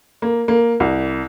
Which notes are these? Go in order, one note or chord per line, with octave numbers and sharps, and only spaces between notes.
A#3
A#3
C2